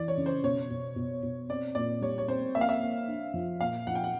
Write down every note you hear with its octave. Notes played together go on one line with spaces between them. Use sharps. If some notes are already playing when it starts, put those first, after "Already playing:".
Already playing: E3 D5
C#5
C#3
C5
B2 C#5
B2
B2
B2
C4 D5
A#2 D5
G3 C#5
C#5
C4 C5
A#3 E5
F5
E5
A#3
D4
F3
A#2 F5
F3 F#5
G5
F#5